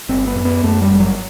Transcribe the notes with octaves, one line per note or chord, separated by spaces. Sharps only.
G1 C4
B3
F#2
B3
F#2 A3
G3
G1
F#3